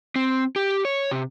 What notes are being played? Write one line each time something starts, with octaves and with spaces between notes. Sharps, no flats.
C4
G4
C#5
C3